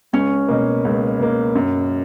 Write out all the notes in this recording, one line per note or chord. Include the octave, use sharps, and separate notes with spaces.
C#2 C#4
B2 A#3
C#2
B2 A#3
F#2